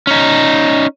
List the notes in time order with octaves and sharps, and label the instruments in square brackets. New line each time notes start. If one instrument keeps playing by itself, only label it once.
[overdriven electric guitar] C#4 D#4